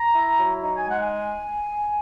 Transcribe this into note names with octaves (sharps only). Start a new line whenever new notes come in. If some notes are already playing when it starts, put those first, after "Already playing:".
Already playing: A#5
E4
F#3
D#4 A#5
G#5
G#3 F#5
G#5